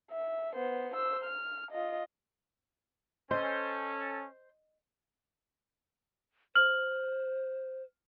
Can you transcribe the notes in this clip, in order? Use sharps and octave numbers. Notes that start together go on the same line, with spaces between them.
E5
B3 C5
C5 E6
F6
F4 D#5
C#4 A4 C5 D#5
C5 F6 F#7